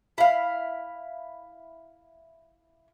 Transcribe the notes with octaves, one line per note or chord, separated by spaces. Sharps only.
E4 F5